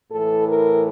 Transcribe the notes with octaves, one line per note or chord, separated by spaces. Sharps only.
A2 E3 A4
A#4